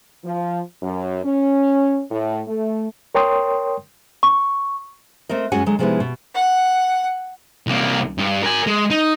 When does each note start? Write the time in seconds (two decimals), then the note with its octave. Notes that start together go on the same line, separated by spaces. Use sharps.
0.24 F3
0.82 F#2
1.24 C#4
2.11 A2
2.48 A3
3.15 A#4 C#5 G5 C6 D#6
4.23 C#6
5.29 A3 C4 A#4 D#5
5.52 F#2 G#3 C#4 F#4 F#5 G#5
5.66 D3 F#3 G#3
5.79 C3 F3 G#3 B3 D#4 E4
6.00 B2
6.35 F#5
7.67 C2 A#3
8.18 G2
8.43 A#4 G#5
8.67 G#3
8.91 D#4